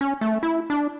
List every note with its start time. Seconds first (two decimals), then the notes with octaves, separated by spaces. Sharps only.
0.01 C#4
0.21 A3
0.43 E4
0.70 D4